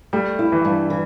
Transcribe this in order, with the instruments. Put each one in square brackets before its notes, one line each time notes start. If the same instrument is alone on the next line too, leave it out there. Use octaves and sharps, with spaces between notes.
[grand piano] G3 [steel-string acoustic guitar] A3
[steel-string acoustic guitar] E4
[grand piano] E3
[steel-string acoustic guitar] G2
E3